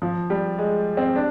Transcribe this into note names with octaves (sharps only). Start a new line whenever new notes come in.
F3
G3
G#3
C4
D4